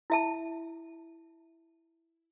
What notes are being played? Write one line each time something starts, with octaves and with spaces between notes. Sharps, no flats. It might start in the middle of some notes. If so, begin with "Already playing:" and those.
E4 E5 A5